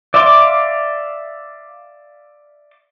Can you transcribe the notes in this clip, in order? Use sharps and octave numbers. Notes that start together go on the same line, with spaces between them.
D5 E5 F5 C6 D6